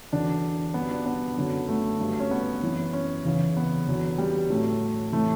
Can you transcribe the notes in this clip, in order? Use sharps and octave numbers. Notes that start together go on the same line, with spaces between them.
E2 D3 F#3 D4
G2 F#3 B3
D4
B3
F#2 D3 F#3
A3
G2 F#3
C#4
B3
F#2 E3
C#4
E2 C#3 E3
B3
E2 D3 F#3
G3
A2 F#3 A3
A2 E3 A3